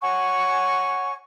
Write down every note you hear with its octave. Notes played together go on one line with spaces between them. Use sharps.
C#5 F#5 G#5 C#6